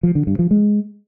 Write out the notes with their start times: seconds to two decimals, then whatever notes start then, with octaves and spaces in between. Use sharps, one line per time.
0.03 F3
0.15 D3
0.27 G2
0.39 F3
0.51 G#3